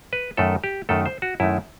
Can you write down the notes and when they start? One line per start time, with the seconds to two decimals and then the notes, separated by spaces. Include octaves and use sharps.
0.13 B4
0.37 F#2 D#3 A3 A4
0.64 G4
0.89 F#2 D#3 A3 A4
1.06 C5
1.22 F#4
1.40 F#2 D#3 A3 E4